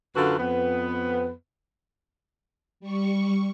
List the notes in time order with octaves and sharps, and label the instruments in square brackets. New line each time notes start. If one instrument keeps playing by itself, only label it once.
[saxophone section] F#2 D3 F4 F#4 A4 B4
F2 B3 B4
[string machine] G3 C#6